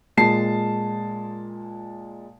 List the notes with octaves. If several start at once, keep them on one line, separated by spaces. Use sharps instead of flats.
A#2 G#3 A5 C7